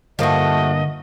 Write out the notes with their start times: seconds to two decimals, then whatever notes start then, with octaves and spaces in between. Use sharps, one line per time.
0.19 G2 D3 F3 A3 A#3 F#4 D#5